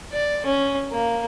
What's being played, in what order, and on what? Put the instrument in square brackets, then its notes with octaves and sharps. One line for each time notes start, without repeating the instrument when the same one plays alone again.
[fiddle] D5
C#4
A#3